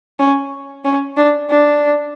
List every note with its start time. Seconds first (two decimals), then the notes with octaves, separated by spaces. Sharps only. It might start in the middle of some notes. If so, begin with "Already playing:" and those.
0.19 C#4
0.85 C#4
1.17 D4
1.50 D4